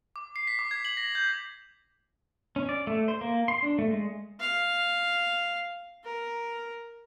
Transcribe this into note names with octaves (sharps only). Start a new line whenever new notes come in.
D6
C7
B6
D6
G#6
F#7
A#6
G6
C#4
D5
A3
C5
A#3
C6
D4
A3
G#3
F5
A#4